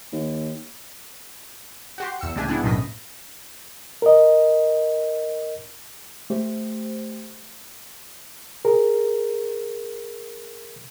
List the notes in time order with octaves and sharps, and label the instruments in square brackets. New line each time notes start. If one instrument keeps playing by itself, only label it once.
[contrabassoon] D#2
[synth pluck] F#4 G4 C6
E2 E6 C#7
C#2 A2 D4 G4 G#5
B3 D4 E4 G#4
B1 F#2 A2 D#5 B6
[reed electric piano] A#4 D#5
[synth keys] A3 G4 C5
[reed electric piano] G#4 A#4